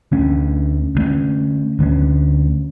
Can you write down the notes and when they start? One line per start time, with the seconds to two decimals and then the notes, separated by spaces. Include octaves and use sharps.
0.12 D2 D3 A3 C#4
0.95 D2 D3 A3 C#4
1.79 D2 D3 A3 C#4